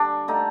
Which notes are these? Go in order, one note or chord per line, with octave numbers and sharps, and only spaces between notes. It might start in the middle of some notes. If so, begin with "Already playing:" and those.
Already playing: D3 G3 D4
D3 A3 D#4